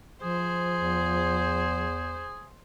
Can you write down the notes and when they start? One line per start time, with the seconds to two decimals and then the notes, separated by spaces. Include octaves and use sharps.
0.22 F3 G#4 C5
0.75 E2